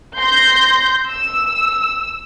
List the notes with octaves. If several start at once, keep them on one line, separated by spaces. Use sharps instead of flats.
C6 G6 A#6
E6